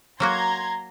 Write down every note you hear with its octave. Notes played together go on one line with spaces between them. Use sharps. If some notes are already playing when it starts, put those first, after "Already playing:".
F#3 A#3 F#4 A#5 C6 G#6